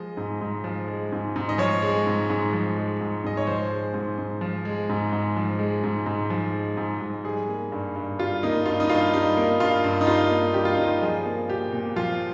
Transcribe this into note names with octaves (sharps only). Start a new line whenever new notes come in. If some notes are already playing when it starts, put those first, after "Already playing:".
Already playing: F3 G#3 D#5
G#2
G#2
F3
G#3
G#2
G#2
D#5
F3 C#5
G#3
G#2
G#2
F3
G#3
G#2
G#2 D#5
C#5
F3 C5
G#3
G#2
G#2
F3
G#3
G#2
G#2
F3
G#3
G#2
G#2
F3
G#3
G#2
G#2
G3 G#4
A#3
G2
G2
G3 F4
A#3 D#4
G2 F4
D#4
G2 F4
G3 D#4
A#3
G2 F4
G2
D#4
G3 F4
A#3
G2 G4
F4
G2 D#4
F4
F3 G#4
A#3
A#2 G4
A#2
F3 F4